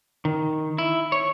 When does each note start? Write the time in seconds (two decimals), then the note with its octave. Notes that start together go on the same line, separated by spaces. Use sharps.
0.25 D#3
0.78 E4
1.12 C#5